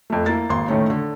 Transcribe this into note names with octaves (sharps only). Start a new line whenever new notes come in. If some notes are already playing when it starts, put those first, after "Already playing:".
F2 A3
A#3 E4 A6
G#1 A#3 C6
A2 D#3 A3 C#4
D3